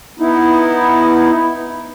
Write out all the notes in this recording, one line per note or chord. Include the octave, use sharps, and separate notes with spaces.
B3 D#4 E4